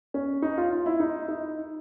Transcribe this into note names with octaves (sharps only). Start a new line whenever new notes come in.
C#4
D#4
F4
F4
E4
D#4
D#4